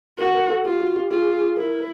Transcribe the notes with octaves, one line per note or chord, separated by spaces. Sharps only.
F#4 A#4
A#4
A4
F4 G4
F#4
G4
F4 G#4
E4 A#4